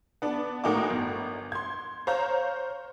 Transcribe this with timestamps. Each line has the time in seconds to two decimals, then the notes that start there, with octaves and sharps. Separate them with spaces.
0.22 B3 D4
0.64 A2 A#3 D#4 F#4 G#5 D6
0.90 G1
1.52 C6 G#6
2.07 C5 C#5 F5 A#5 G6